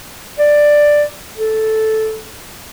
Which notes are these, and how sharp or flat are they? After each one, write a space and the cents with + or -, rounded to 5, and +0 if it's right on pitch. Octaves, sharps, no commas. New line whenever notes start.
D5 +5
A4 -5